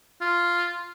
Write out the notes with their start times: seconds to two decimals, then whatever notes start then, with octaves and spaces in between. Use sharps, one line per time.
0.21 F4